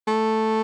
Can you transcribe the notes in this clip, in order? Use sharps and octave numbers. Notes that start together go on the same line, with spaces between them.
A3